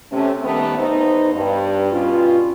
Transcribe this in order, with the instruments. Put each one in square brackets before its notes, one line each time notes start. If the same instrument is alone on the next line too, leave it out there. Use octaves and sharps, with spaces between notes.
[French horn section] C3 A3 C#4
D#3 G3 A3 B3
E2 B3 D#4 C5
G2
G2 B2 C#4 F4